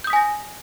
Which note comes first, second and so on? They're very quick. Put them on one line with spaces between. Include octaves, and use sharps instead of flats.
G6 D#6 B6 G#5 A#6